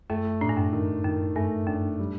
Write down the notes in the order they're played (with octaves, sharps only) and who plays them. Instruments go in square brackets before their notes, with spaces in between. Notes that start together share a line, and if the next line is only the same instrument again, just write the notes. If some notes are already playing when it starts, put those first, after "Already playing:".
[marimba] F#2 [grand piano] A3
[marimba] A2 [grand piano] D4
[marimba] G2
F#2
[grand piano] D#3
[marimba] F#2 [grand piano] D#3
[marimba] G2 [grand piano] A3
[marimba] F#2 [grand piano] D4
[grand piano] G3